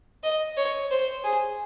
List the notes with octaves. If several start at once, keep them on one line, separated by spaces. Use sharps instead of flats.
D#5
C#5
C5
G#4